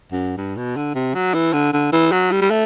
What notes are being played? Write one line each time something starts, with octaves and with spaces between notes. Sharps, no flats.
F#2
G2
B2
D3
C3
F#3
E3
D3
D3
E3
F#3
G3
G3
A3